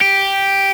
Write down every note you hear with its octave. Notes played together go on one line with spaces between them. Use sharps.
G4